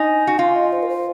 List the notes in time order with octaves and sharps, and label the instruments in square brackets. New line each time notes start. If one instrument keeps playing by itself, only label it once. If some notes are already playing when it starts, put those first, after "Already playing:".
Already playing: [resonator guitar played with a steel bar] D#4 [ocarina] G#5
[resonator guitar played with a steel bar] F#4
[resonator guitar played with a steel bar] F4 [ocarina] F5
[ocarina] D#5
C5
A#4
C5